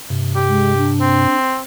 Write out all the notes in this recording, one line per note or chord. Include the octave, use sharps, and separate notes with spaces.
G2 C3
G4
G#3
D4
C4